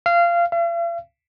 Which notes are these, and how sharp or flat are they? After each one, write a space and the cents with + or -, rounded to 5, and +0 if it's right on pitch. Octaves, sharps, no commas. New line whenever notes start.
F5 -20
F5 -45